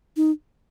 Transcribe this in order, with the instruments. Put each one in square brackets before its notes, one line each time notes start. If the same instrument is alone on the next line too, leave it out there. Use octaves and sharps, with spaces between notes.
[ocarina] D#4